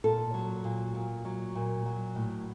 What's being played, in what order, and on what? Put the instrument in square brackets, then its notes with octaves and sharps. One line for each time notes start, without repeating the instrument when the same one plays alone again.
[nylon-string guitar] A#2 A4
F#3
A#2
A#2
F#3
A#2
F#3
A2